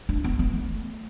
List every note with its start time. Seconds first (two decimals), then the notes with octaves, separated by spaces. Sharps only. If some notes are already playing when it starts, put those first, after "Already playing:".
0.09 D4
0.24 B3
0.39 B3
0.53 A3